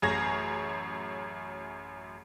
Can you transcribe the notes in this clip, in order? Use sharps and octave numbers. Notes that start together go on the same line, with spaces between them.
A1 F#2 G#4 C#5 G#6 A#6